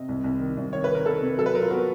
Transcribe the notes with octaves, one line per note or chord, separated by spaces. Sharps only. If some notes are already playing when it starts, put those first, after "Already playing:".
Already playing: C3 D#5
C2
C2
D#3
C2
D#3 C#5
B4
D#3
A#4
D#3 A4
C3
F#3 A4
B4
F#3 A#4
F4
B3 F#4